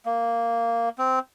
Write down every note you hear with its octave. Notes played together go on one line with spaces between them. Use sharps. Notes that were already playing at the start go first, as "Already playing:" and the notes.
A#3
C4